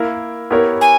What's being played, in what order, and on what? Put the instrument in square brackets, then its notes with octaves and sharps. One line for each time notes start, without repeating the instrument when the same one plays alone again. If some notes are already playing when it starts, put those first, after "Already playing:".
Already playing: [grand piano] A#3 E4 A#4
B3 E4 G4 A#4 C#5
[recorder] G#5